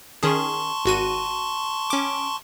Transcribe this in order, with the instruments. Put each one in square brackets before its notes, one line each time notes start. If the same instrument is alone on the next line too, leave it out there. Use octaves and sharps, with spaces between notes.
[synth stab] D#3 C#4 G#4 [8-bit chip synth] A5 C6 C#6
[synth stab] G#1 F#4 D#7
C#4 D6